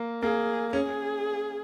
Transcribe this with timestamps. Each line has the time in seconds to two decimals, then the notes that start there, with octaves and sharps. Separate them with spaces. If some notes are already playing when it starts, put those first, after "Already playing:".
Already playing: A#3
0.23 A#3 G#4
0.73 C#4 G#4